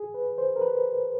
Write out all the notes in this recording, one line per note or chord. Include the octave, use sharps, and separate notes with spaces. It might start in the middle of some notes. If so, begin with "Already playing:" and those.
Already playing: G#4
B4
C5
A#4
B4